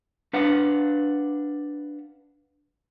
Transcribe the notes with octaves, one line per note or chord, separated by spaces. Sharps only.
D4 B4 F5 F#5